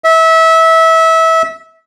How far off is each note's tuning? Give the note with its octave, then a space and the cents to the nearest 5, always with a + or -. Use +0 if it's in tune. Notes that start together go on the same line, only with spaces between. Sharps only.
E5 -25